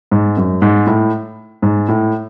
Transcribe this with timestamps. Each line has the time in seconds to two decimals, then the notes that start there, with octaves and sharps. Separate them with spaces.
0.11 G#2
0.37 F#2
0.62 G#2
0.87 A2
1.62 G#2
1.88 A2